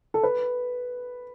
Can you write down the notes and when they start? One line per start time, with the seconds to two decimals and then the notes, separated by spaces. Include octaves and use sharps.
0.14 A4
0.23 B4